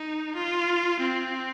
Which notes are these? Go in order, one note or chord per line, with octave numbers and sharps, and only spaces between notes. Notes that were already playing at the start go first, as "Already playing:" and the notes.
Already playing: D#4
F4
C4